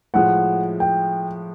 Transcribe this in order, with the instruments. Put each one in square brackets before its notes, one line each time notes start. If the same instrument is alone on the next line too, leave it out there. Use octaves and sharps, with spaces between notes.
[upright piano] A2 F3 G#3 [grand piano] F#5
[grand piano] G5